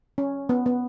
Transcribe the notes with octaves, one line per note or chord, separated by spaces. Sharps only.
C#4
B3
B3